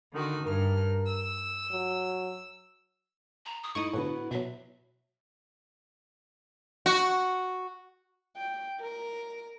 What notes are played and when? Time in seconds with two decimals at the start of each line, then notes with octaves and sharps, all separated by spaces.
0.12 D3 D#3 F#4
0.45 G2 A#4 F6
1.06 E6
1.71 F#3
3.46 A#5
3.63 D#6
3.75 A3 D#4 E4 C#6 D#6
3.93 A2 D3 B3 F#4 B4
4.31 B2 F#3 E5
6.86 F#4
8.37 G5
8.80 A#4